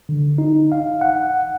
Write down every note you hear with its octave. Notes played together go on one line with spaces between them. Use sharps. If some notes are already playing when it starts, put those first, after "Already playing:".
D3
D#4
F5
F#5